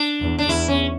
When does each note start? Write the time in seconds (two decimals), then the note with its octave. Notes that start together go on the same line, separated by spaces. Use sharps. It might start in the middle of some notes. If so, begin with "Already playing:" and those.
Already playing: D4
0.21 E2
0.39 D4
0.49 E2 E4
0.68 C#4